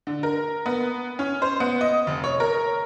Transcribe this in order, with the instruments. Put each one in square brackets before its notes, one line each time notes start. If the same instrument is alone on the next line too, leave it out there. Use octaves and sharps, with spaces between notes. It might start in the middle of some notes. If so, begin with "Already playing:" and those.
[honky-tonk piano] D3
A#4
B3
C#4
C5
B3
D#5
F1
C#5
A#4